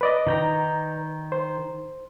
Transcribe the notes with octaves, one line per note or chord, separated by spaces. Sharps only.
B4 D5 D#5
D#3 G5 A#5
C5